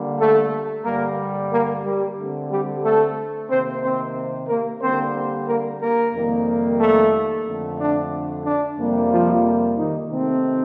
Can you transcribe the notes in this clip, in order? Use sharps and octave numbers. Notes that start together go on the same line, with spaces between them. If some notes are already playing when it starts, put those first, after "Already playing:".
Already playing: D3 G3 A#3
A3 A4
G2 D3 G3 A#3 A#4
A#3 A#4
G3 G4
D3 A3 C4
G3 G4
A3 A4
C3 D#3 A#3 C4 C5
C4 C5
A#3 A#4
D3 G3 A#3 C4 C5
A#3 A#4
A#3 A#4
F2 C3 D#3 G3 A#3
A3 A4
F2 D3 A3
D4
D4
F2 C3 G3 A#3
F3 F4
D#3 D#4
C3 D#3 A3 C4